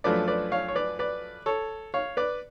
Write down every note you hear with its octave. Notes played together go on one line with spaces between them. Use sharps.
F#2 F3 A3 D4 B4 D5
B4 D5
C#5 F5
C#5
B4 D5
B4 D5
A4 C#5
C#5 F5
B4 D5